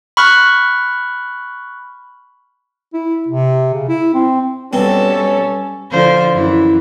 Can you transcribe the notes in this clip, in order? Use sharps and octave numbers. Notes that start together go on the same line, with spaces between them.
B5 C#6 F6 F#6
E4
C3
C#3
E4
C4
G2 B2 G3 C4 C#4 A4
D3 F3 C5
F#2 E3 E4